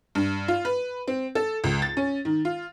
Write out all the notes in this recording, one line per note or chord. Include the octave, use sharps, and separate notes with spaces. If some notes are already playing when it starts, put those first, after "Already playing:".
G2
F4
B4
C4
A4
C#2
A6
C#4
D#3
F4